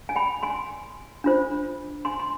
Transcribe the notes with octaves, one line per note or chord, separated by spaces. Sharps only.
G#5
G5 B5
G#5 C6
D4 F4 C5
G#5 C6
C6